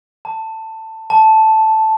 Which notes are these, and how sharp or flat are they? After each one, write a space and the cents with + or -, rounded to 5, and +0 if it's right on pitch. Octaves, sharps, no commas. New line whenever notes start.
A5 +15
A5 -5